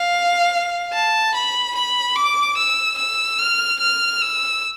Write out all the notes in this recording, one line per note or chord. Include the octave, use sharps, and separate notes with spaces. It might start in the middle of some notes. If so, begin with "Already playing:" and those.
Already playing: F5
A5
B5
B5
D6
E6
E6
F6
F6
E6